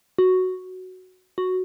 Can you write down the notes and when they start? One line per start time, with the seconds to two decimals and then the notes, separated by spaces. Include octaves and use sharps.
0.18 F#4
1.38 F#4